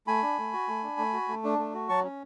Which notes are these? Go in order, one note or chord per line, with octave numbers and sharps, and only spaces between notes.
A3 G#5 B5
D4
A3
F#4
A3
D4
A3
F#4
A3
D4
A3
F#4
F#3 A5 C#6
C#4